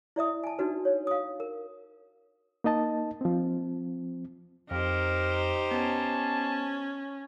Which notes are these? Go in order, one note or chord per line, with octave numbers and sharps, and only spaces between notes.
E4 D5 E5 D#6
G#5 A5
D4 D#4 F#4 B4
C#5
F5 D#6
A#4
A#3 D#4 D#5 A5
F3 C4
F2 D#4 G4 A#4 C5
B3 C#4 A5